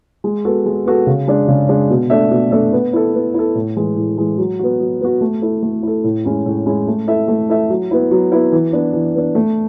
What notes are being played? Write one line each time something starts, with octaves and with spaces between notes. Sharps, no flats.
G#3
B3 F#4 A4
G#3
B3 F#4 A4
C#3
G#3 D4
C#3
G#3 D4
B2
A3 D4 A4 E5
B2
A3 D4 A4 E5
B3
E4 A4
B3
E4 A4
A2
E3 G#3
A2
E3 G#3
F#3
B3 F#4
F#3
B3 F#4
A3
E4 A4
A3
E4 A4
A2
G#3 C#4 E4
A2
G#3 C#4 E4
A3
E4 A4 E5
A3
E4 A4 E5
F#3
B3 E4
F#3
B3 E4
E3
B3 D4
E3
B3 D4
A3